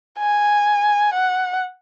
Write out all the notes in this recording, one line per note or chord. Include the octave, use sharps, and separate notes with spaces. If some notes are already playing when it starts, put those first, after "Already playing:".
G#5
F#5